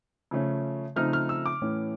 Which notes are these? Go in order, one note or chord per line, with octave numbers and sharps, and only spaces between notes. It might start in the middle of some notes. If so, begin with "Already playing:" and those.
C#3 F3 A3 C#4
C#3 F3 A3 C4 D#4 F6
F6
E6
D6
A2 E3 A3 C#4